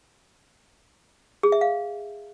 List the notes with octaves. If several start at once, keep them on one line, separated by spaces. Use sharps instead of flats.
G#4
E5
F5